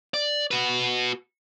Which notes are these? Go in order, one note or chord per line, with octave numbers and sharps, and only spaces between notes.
D5
F#4 B4